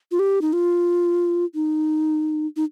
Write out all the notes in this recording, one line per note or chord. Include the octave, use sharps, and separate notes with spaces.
F4
G4
D#4
F4
D#4
D#4